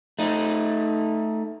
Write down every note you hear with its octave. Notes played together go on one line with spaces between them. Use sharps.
A3 D#4